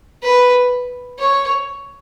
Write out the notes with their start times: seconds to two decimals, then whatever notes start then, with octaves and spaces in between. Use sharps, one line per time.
0.23 B4
1.19 C#5